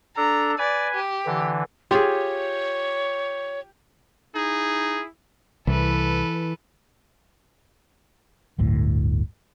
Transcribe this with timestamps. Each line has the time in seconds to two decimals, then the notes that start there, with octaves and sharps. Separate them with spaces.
0.17 D4 A4 A#5
0.59 B4 D5 G#5
0.95 G4
1.26 D3 E3
1.91 F4 G4 G#4 C#5
4.35 D#4 E4 G#4
5.67 C2 E3 A4 B4
8.58 D1 G1 D2 A2